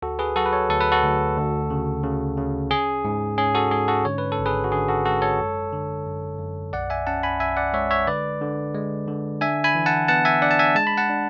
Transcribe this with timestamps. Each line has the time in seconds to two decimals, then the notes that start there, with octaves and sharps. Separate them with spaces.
0.02 D2 F#4 A4
0.19 G#4 B4
0.36 F#3 F#4 A4
0.46 B4
0.53 A4 C#5
0.70 D2 A4
0.81 B4
0.92 F#4 A4
1.03 D2
1.37 D2
1.70 C#3
2.03 C#3
2.37 C#3
2.70 C#4 G#4
3.05 G#2
3.38 C#4 G#4
3.55 F#4 A4
3.71 G#2 G#4
3.88 F#4 A4
4.05 D3 C#5
4.18 B4
4.32 A4
4.39 G#1
4.46 G#4 B4
4.64 F#4
4.72 D3 G#4
4.89 F#4 A4
5.05 G#3 F#4 A4
5.22 A4 C#5
5.40 F#2
5.73 D3
6.06 F#2
6.39 F#2
6.73 B1 D5 F#5
6.90 E5 G#5
7.07 C#4 F#5 A5
7.23 G#5 B5
7.40 B1 E5 G#5
7.57 D5 F#5
7.73 G#3 C#5 E5
7.91 C#5 E5
8.07 D3 B4 D5
8.41 D3
8.75 G#3
9.08 D3
9.41 D4 E5 G#5
9.64 G#5 B5
9.75 E3
9.86 F#5 A5
10.08 B3 F#5 A5
10.25 E5 G#5
10.42 D4 D5 F#5
10.51 A5
10.59 E5 G#5
10.75 G#3 A5
10.87 B5
10.98 F#5 A5
11.09 D4